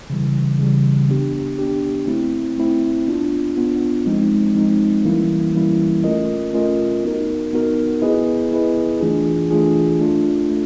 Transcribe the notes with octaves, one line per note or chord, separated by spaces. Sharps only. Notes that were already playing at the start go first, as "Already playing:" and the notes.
C#3 E3 G3
C#3 E3 G3
B3 D4 G4
B3 D4 G4
A3 C4 E4
A3 C4 E4
B3 D4 F4
B3 D4 F4
F3 G#3 C4 D#4
F3 G#3 C4 D#4
E3 G3 A#3 C#4 E4
E3 G3 A#3 C#4 E4
A3 C#4 F4 A#4 D#5
A3 C#4 F4 A#4 D#5
B3 D#4 F#4 A#4
B3 D#4 F#4 A#4
B3 E4 G#4 B4 D#5
B3 E4 G#4 B4 D#5
E3 A3 D4 F4 G#4
E3 A3 D4 F4 G#4
A3 D4 F4
A3